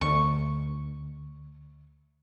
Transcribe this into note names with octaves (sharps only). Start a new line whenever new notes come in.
D2 C#6